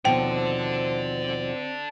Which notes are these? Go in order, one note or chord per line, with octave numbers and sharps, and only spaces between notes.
D#2 B2 F3 C4 A4 D5 G5